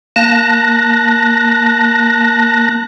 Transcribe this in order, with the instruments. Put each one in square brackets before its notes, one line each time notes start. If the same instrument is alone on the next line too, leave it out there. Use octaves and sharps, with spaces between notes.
[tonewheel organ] A#3 A5 F#6 A#6